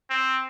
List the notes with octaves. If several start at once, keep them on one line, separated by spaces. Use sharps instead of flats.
C4